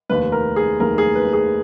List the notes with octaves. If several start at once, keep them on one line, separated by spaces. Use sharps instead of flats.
F1 D#2 D#3 B4
A#4
G#4
F1 D#2 D#3 A#4
G#4
B4
G#4